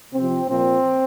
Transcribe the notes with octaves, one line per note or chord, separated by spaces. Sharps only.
C3 F3 C4
A#2 F3 C4